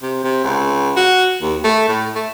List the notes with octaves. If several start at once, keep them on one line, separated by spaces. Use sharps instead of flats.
C3
C3
C#2
F#4
D#2
A3
A2
A3